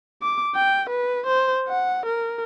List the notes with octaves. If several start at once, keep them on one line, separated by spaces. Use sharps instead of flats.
D6
G5
B4
C5
F#5
A#4